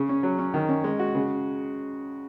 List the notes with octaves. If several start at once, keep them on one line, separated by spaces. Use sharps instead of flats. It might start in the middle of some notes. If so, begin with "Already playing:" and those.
Already playing: C#3
C#4
F#3
C#4
D#3
C#4
G#3
F#4
C#3